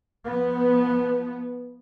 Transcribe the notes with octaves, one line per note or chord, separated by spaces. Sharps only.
F3 B3